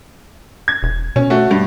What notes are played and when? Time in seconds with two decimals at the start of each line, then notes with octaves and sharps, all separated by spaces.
0.68 G#6
0.83 E1
1.16 B2 C#4
1.30 A3 F#4
1.51 G2